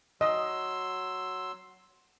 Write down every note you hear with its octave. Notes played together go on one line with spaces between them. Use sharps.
F#3 D#5 C6 E6